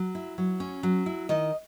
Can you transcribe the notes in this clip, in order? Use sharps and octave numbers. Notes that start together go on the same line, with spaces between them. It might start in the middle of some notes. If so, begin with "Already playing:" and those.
Already playing: F#3
E4
F#3
C#4
F#3
E4
D#3 D#5